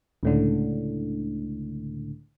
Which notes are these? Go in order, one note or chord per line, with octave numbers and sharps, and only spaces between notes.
C#2 A2 D3